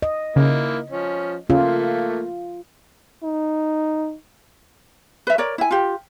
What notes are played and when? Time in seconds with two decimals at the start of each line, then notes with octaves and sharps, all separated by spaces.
0.02 D#5
0.36 C#3 A#3 D#4 E4
0.90 F3 C#4
1.50 C#3 A3 A#3 F4
3.23 D#4
5.27 B4 E5
5.38 A#4 C#5 D5
5.58 E4 G#5
5.71 F4 G4